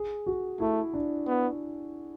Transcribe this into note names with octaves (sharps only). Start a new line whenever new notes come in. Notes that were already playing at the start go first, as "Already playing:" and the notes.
Already playing: G#4
F#4
A3 E4
D4
B3